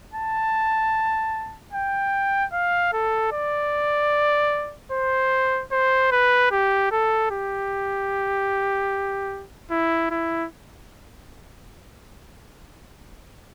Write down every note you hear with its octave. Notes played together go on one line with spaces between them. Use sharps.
A5
G5
F5
A4
D5
C5
C5
B4
G4
A4
G4
E4
E4